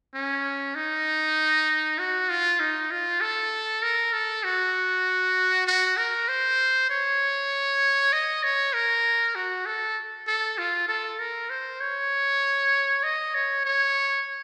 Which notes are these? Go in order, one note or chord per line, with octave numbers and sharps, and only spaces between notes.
C#4
D#4
F#4
F4
D#4
F4
A4
A#4
A4
F#4
F#4
A#4
C5
C#5
D#5
C#5
A#4
F#4
A4
A4
F4
A4
A#4
C5
C#5
D#5
C#5
C#5